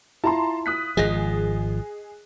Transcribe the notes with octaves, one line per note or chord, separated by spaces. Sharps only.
E4 F4 A5 A#5 C6
D#6 F#6 B6
G#1 F3 G#4 D#5 A#6